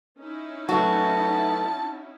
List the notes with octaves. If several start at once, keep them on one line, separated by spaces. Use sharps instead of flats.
C#4 D#4 E4
F#3 A3 B3 F#4 A5